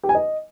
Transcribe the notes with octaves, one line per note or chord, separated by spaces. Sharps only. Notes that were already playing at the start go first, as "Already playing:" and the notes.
G4
G#5
D#5